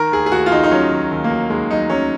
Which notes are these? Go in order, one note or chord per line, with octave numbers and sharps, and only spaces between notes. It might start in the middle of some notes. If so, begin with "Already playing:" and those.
Already playing: D#3 A#4
D#2 G#4
G#4
D#2 F#4
F4
D#2 D#4
D#4
F#3 C#4
D#3
D#2
A#3
F#3
D#2 G#3
F#3 D#4
F#3 C#4